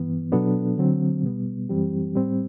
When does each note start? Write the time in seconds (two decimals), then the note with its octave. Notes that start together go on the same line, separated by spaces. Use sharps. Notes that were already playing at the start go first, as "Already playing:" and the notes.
Already playing: G2 E3 B3
0.32 B2 F#3 B3 D4 A4
0.78 D3 F#3 C4
1.23 B2 G3 B3
1.69 F#2 E3 G3 C4 G4
2.15 A2 G3 C4